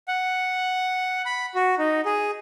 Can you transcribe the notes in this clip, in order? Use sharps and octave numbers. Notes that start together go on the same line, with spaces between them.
F#5
B5
F#4
D#4
G#4